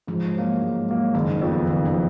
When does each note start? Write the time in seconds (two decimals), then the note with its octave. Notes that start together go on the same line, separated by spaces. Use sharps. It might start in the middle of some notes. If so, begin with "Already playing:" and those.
0.07 G#2 F3
0.35 F#3 A#3
0.62 G#2
0.88 F#3 A#3
1.14 F#1 D#3
1.42 F2 F3 B3
1.68 F#1 D#3
1.86 F3